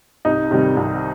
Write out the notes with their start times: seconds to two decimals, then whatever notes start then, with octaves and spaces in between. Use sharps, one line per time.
0.25 C2 D#4
0.51 C3 D#3 G3
0.77 C2